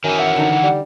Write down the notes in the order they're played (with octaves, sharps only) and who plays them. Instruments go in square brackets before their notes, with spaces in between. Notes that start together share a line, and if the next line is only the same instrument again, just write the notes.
[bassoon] F#2 [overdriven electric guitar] D#3 E3 [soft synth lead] G#5
[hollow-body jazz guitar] E5 [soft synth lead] F#5
[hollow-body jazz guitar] D3 D4 D#4
[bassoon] G3